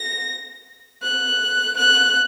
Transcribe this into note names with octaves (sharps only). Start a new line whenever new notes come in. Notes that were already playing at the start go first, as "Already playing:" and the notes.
Already playing: A#6
F#6
F#6